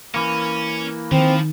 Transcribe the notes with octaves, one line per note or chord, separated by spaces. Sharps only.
E3 A#3 C#4
D#3 F3 C4